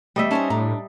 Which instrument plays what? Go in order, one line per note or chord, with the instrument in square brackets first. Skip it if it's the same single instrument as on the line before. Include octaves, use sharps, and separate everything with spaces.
[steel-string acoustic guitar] E2 A3 [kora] G3 D#5 E5
[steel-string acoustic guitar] C#4 C5 G#5 [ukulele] D#4 C#5 A5
[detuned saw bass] A2 [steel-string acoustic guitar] D4 [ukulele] A#5